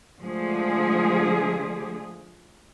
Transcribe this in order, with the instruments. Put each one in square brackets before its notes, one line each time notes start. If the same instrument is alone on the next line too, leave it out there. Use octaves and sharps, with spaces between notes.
[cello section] D3 F3 G#3 A3 G#4